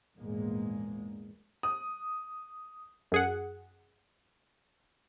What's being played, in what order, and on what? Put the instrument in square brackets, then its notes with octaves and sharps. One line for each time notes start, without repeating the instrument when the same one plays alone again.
[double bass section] A#1 E2 G#2 G#3 A#3
[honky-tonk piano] D#6
[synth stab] F#2 G#4 F#5